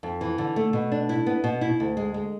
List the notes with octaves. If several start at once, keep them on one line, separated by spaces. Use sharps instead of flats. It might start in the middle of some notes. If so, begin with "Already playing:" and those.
F2
E3
D3
A3
B2
D4
E4
B3
B2
E4
D2
G#3
G#3